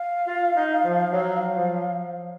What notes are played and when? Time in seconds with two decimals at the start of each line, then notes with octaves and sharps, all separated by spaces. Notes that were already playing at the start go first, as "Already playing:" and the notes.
Already playing: F5
0.27 F4
0.55 D#4
0.84 F3
1.12 F#3
1.55 F3